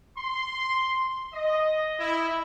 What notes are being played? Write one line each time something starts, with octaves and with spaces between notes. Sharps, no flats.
C6
D#5
E4